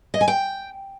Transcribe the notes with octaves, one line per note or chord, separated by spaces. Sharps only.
D#5
G#5
G5